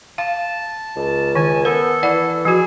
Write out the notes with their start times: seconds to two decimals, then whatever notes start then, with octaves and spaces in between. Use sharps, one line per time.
0.18 F5 A5
0.96 C#2
1.35 D#3 G#5 A5
1.65 B3 A4 A#4
2.03 E3 D5 F#5
2.45 F3 F#4 G#4